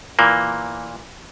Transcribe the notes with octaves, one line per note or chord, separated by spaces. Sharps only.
A#2 E3 A#3